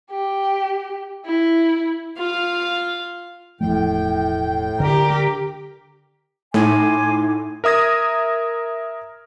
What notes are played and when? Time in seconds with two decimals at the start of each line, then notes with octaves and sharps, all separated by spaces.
0.11 G4
1.25 E4
2.18 F4 F5
3.61 E1 A2 F3 A3 G5
4.80 D3 G4 A#4
6.54 A2 D#4 G#5 C6 D6
7.64 A#4 E5 D#6 G#6 A#6